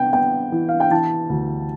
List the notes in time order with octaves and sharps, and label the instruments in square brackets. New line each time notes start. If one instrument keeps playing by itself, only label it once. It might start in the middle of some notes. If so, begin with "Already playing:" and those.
Already playing: [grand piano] C3 B3 [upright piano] G5
[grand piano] B3 [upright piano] G5
[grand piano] E3
[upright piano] F5
G5
[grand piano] E3 [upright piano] A5
[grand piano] D2